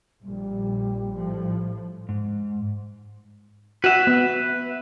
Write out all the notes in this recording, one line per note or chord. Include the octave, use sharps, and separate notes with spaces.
A#1 A#2 G3
A2 F3
G#2
F#4 B4 E5
B3